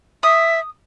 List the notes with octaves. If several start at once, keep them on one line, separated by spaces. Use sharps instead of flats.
E5 D#6